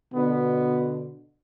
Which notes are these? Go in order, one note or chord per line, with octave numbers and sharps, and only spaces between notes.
B2 D3 B3